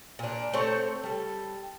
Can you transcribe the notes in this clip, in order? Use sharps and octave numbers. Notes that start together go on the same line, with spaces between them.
A#2 D4
A3 C4 C5 C#5
G3 A4